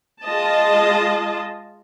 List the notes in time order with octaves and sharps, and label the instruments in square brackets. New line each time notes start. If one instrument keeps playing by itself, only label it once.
[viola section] G#3 F4 D#5 A5